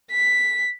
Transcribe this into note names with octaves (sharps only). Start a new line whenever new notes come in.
B6